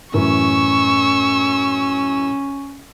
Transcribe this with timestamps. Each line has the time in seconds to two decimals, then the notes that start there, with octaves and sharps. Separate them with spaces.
0.14 F#2 A2 E3 C#4 C#6 E6